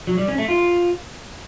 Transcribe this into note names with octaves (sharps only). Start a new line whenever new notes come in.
F#3
G3
C#4
A3
F4